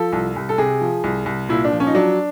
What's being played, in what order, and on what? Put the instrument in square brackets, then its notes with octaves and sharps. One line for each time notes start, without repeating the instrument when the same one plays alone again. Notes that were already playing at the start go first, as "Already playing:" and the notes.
Already playing: [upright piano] F3 A4
C2
C2
A4
C3 G#4
F3
C2
C2
A#2 E4
D4
F3
C#4
D#4
F#3 D4